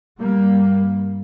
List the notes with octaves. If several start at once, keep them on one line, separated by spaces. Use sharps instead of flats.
G2 G3 A#3